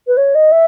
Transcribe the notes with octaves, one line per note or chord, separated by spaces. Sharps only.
B4
C#5
D#5
E5